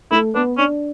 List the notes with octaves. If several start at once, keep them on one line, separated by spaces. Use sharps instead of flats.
A3 E4
B3 D4
C#4 D4